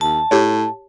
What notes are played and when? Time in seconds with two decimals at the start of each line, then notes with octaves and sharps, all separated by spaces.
0.01 D#2 A5
0.31 A2 G4 C#5